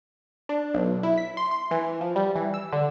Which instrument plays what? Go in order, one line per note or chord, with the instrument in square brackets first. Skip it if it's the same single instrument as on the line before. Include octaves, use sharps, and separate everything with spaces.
[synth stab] D4
B1
E4
B6
C6
C6
E3
F3
G3
E3
E6
D3